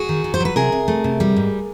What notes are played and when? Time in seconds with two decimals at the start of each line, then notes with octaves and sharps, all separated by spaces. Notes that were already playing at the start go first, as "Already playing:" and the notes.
Already playing: F#4 G#4
0.09 D#3
0.24 D#3
0.34 C5
0.40 F#3 B4
0.56 C3 G#4 A#4
0.72 C3
0.88 A3
1.04 C3
1.20 G3
1.36 G#2